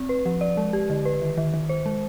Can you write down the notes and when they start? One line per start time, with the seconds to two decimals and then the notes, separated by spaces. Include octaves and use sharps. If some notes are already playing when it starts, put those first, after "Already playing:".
Already playing: C4
0.09 B4
0.26 F3
0.41 D5
0.57 G#3
0.73 G4
0.90 D3
1.05 B4
1.22 D#3
1.38 D#3
1.54 D#3
1.69 C5
1.86 G#3